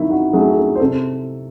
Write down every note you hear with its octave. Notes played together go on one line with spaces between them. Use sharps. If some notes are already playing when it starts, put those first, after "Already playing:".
Already playing: D#3 F#3 D#4 E4
F#4
F#3 A3 G#4
A4
C5
C3 A4